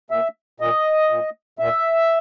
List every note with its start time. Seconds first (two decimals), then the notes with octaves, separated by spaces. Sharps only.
0.10 A#2 E5
0.60 A#2 D#5
1.10 A#2
1.59 A#2 E5